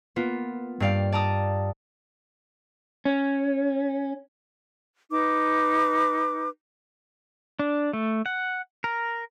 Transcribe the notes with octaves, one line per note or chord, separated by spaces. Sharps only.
A#3 B3 F4
G2 A#3 D5 F5 G5
D5 A5 A#5 D#6
C#4
D#4 B4 D6
D4
A3
F#5
A#4